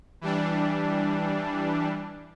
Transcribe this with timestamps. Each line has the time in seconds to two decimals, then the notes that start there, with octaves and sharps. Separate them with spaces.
0.21 E3 G3 D4